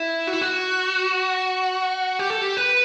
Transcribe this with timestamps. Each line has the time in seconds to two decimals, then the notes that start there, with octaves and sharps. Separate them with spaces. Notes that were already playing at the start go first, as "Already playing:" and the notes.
Already playing: E4
0.27 F#4
0.33 E4
0.41 F#4
2.19 G4
2.30 A4
2.41 G4
2.57 B4